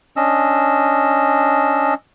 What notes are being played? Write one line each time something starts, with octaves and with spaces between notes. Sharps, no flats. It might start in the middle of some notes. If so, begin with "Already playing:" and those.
C#4 D4 D#5 E6